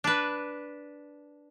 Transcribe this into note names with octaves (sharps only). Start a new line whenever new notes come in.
D4 B4